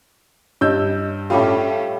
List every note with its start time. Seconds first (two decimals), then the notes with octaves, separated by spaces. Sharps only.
0.61 G2 C#5 D#5 E6 G6
1.30 A2 G3 A3 C#4 F4 A4 B5 D6